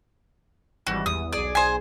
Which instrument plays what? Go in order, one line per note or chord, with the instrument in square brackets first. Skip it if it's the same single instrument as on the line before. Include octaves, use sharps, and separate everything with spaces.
[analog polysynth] G#1 E3 G3 [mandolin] F#4
[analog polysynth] E2 [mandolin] D#6
[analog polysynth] B1 G#4 [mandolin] D5
[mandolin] C5 G#5